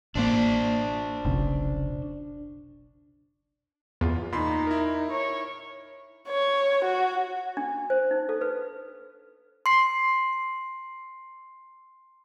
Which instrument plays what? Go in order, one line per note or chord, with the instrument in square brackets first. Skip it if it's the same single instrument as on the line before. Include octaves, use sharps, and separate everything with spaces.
[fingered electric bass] A1 A#3 [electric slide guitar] D4 C5 D5
[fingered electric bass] F1 B1 C#3
[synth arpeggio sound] E2 [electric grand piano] F4
[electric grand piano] A#2 B5 C6 [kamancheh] D#4
[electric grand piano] E4 A#4
[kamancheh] C#5 C#6
C#5
F#4
[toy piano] D4
C5
D#4
A4
B4
[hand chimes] C6 C7